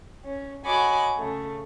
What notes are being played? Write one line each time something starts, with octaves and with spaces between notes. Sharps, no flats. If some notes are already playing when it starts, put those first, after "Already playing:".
C#4
F#4 C#5 D#5 G#5 B5 D6
C#3 A3